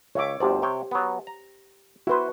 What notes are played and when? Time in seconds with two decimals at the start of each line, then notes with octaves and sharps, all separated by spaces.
0.15 C#2 C#5 E5 D6
0.40 G1 D2 G4 C5 D5
0.62 C3 C#5 G5
0.91 F#3 B3
1.27 A#5
2.07 E4 F#4 B4 C5